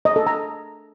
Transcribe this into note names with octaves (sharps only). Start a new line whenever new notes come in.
D#5
A4
A#5